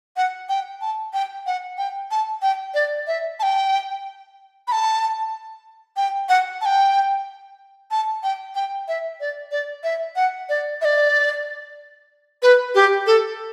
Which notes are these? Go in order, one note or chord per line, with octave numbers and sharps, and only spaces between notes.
F#5
G5
A5
G5
F#5
G5
A5
G5
D5
E5
A5
G5
B5
A5
G5
F#5
A5
G5
A5
G5
G5
E5
D5
D5
E5
F#5
D5
E5
D5
B4
G4
A4